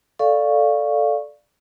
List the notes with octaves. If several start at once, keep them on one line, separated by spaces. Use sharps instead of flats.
A4 D5 F5 C#6